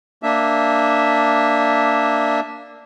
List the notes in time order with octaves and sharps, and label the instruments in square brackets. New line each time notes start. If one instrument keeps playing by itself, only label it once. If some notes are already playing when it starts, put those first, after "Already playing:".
[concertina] A#3 D4 E5